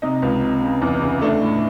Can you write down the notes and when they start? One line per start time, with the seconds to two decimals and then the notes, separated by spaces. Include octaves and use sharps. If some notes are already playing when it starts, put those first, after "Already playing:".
0.02 C3 D#4
0.22 C#2
0.42 C3
0.62 C#3
0.82 E2
1.02 C#3
1.22 A3 D4
1.42 A2